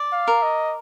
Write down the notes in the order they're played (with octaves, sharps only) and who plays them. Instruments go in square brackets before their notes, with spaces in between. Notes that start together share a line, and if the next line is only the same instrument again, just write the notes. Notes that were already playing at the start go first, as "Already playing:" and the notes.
Already playing: [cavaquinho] D5
[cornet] F5
[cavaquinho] A#4
[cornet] D#5